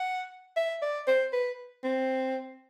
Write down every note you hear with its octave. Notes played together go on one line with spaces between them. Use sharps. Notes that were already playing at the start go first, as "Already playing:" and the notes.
Already playing: F#5
E5
D5
C5
B4
C4